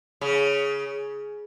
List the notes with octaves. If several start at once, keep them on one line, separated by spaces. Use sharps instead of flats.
C#3